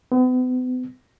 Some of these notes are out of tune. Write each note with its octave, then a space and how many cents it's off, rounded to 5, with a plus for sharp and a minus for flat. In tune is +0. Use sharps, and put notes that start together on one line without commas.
B3 +40